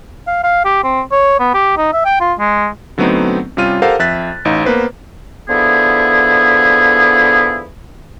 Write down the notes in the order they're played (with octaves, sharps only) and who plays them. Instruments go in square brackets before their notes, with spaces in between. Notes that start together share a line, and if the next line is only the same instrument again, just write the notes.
[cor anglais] F5
F5
G4
C4
C#5
B3
G4
D#4
E5
G5
F4
G#3
[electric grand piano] D3 F#3 A3 B3 C4 D#4
C3 G3 C#4 F4 F6 D#7
G4 A4 A#4 C5 F5 F#5
F2 E5 F#6 A6 B6
A1 D#4 F5
A#3 B3 B4 C5
[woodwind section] D3 E3 F3 B3 E4 G#4